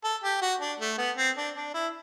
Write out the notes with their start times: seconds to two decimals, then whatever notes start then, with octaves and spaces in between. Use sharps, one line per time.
0.04 A4
0.23 G4
0.42 F#4
0.61 D4
0.80 A3
0.98 B3
1.17 C4
1.37 D4
1.56 D4
1.74 E4